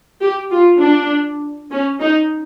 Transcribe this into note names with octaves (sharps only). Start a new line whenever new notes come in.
G4
F4
D4
C#4
D#4